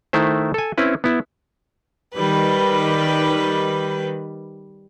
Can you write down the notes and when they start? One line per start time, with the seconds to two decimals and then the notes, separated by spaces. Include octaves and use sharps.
0.13 D#3 A3 E4 C5
0.54 A4 G#5
0.78 C4 C#4 E4 B4
1.04 B3 E4
2.16 D#3 G3 B4